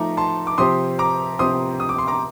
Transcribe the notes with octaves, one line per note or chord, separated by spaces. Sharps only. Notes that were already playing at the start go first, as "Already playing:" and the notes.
Already playing: F3 A3 D#4 A#5 D6
A5 C6
D6
C3 F3 C4 G4 C5 C6 D#6
A#5 D6
C3 F3 C4 G4 C5 C6 D#6
D#6
D6
C6
A#5 D6